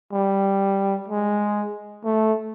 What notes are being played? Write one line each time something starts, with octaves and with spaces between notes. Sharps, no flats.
G3
G#3
A3